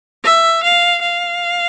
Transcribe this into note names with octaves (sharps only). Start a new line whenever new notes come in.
E5
F5
F5